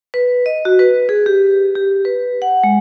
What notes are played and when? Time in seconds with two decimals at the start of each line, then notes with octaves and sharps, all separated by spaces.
0.14 B4
0.46 D#5
0.65 F#4
0.79 B4
1.09 G#4
1.26 G4
1.75 G4
2.05 B4
2.42 F#5
2.64 G#3